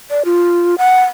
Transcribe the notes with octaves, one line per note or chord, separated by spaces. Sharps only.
D5
F4
F#5